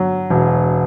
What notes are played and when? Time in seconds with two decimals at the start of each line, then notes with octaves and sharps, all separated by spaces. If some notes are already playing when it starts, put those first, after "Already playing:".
Already playing: D3 F#3
0.30 E1